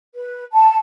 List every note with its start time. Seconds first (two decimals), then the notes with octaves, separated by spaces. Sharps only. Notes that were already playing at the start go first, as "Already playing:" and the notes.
0.14 B4
0.52 A5